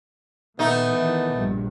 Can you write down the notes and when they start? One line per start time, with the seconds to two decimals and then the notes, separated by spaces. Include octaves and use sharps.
0.59 A#2 D#3 A3 B3 D#4
0.92 D#3 E3
1.35 A#1 G2